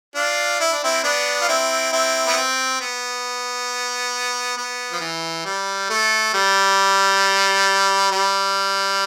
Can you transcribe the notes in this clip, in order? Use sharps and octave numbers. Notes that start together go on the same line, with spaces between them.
D4 F4
E4
D4
C4 E4
B3 D4
F4
C4 E4
C4 E4
B3
C4
B3
B3
F3
E3
G3
A3
G3
G3